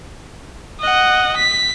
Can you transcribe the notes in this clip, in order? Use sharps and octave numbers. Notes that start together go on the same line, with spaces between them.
D#5 F#5
B6